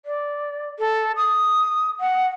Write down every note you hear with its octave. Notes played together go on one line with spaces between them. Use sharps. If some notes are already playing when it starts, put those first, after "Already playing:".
D5
A4
D#6
F#5